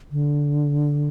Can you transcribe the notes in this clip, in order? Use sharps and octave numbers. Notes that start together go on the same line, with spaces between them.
D3